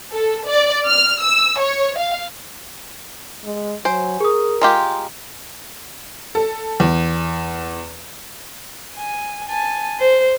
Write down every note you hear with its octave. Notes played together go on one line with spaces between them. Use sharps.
A4
D5
F6
E6
C#5
F5
G#3
F#3 C5 G#5
G#4 A#4 D#6
G#3 F4 G4 A#5 C6
A4
E2
G#5
G#5 A5
C5